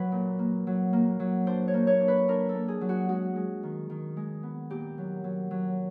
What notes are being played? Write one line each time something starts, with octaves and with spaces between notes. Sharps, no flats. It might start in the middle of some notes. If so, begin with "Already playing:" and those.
Already playing: F#3 B4
A#2
A#3
F#3
A#3
F#3
D4 C5
C#5
A#3
C#5
D4
B4
D4 A#4
A4
A#3
G#4
F#3
F#4
G#3 F#4
G#3
D#3
D#3
G#3
B3
A#2 G4
F#3
F#3
F#3